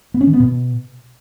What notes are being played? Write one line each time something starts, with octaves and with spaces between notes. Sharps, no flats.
B3
C#4
D#3
B3
B2